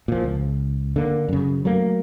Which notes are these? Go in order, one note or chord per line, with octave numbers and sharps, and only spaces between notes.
A#2 F3
C#2
D3 A#3
F#2 C#3
F#3 A3 A#3